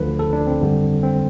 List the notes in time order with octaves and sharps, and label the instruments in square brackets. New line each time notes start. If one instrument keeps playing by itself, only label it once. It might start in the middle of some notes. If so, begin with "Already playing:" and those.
Already playing: [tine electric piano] D2 D3 F3 B4
A4
D4
C4
G1 F2 D3 G3
C4